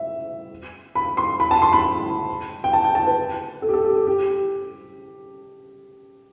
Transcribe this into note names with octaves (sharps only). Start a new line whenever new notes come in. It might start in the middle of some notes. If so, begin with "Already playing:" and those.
Already playing: E5
B5
C6
B5
A5
C6
B5
G5
A5
G5
A5
B4
A4
G4
A4
G4
G4
G4